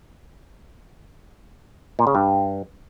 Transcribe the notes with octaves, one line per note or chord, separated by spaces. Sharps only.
A#2
C#3
G2